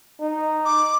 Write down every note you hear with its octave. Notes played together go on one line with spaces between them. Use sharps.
D#4
D6